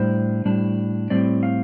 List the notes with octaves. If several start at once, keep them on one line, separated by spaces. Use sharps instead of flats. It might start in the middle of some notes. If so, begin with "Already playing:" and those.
Already playing: A2 G3 D4 C5
A2 G3 D4
A2 G3 C4 D5
F5